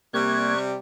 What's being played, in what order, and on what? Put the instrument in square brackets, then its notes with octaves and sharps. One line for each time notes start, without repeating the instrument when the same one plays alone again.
[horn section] C3 G3 [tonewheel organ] A#3 G#6 [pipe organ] C#6 F#6